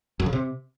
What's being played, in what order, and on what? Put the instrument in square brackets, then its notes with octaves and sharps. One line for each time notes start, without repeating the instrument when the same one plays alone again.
[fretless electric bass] F#2
C#3
C3